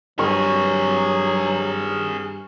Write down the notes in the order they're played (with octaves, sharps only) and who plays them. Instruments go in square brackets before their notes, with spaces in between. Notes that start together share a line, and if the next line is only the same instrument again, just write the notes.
[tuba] G2 [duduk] F#3 [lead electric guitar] G#4 A#4 [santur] C#6